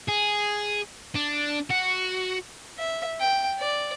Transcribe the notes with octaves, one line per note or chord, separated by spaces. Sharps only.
G#4
D4
F#4
E5
G5
D5